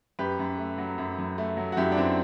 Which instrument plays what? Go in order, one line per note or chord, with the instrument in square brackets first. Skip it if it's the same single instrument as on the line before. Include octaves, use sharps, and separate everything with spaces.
[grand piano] F#2 G4 B4
F#2
A3
F#3
F#2
F#2
A3
F#3
F#4
F#2 E4 G4
D4
F#2 C4 E4